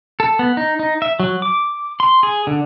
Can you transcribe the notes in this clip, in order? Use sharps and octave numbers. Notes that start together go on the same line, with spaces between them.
A4
B3
D#4
D#4
E5
F#3
D6
C6
G#4
D3